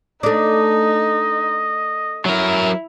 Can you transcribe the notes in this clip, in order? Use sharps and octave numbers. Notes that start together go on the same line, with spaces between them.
A3 D4 D#4 D#5
F#3 E4 A#4